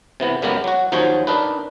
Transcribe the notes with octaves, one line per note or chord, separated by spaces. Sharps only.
C3 E3 B3
F#2 C#3 G#3 A#3 B3 G4
F#3 F#4
D#2 F3 F#3 D#4 C5 C#5
D4 D#4 A#4 B4